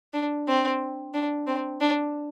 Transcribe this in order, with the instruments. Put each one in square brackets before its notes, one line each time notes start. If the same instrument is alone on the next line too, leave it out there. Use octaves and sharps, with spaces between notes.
[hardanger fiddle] D4
C4
D4
C4
D4